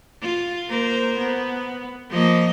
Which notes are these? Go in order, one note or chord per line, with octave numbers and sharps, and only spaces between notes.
F4
A#3 A#4 C5
B3
F3 A#3 D#5